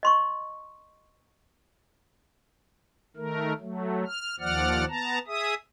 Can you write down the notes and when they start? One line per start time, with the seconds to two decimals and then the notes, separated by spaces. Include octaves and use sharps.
0.03 D#5 C6 C#6
3.17 D#3 A3 A#4
3.60 F#3 A3
4.06 F6
4.40 D#2 F3 D5 F#5 F6
4.88 B3 A5 A#5
5.27 G#4 E5 D#6